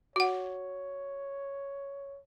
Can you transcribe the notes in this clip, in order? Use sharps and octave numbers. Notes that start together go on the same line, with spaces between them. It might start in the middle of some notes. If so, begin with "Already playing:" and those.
F#4 C#5 F#5